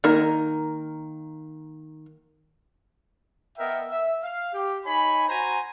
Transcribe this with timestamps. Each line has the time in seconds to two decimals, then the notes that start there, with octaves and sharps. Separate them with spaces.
0.04 D#3 A#3 A#4
3.59 B3 A#4 D#5 E5 G5
3.90 E5
4.23 F5
4.54 G4
4.85 D#4 C#5 G#5 B5
5.28 F#4 C5 G#5 A#5